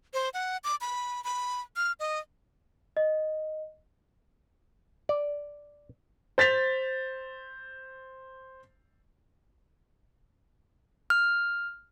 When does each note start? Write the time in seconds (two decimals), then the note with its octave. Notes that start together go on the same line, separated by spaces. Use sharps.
0.14 C5
0.34 F#5
0.64 D6
0.81 B5
1.24 B5
1.76 F6
2.00 D#5
2.97 D#5
5.09 D5
6.38 C5 A6 B6 F7
11.10 F6